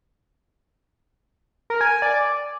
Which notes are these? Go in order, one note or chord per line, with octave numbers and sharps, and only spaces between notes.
A#4
G#5
G#5
D5